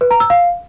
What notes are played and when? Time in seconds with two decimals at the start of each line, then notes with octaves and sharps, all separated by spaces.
0.01 B4
0.11 A#5
0.20 E6
0.30 F5